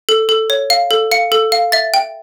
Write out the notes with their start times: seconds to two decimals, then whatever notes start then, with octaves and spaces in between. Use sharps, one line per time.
0.09 A4
0.29 A4
0.50 C#5
0.70 F5
0.91 A4
1.11 F5 C#7
1.32 A4
1.52 F5
1.72 E5 A6
1.94 G5